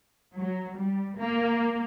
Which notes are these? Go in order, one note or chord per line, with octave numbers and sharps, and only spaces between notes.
F#3
G3
A#3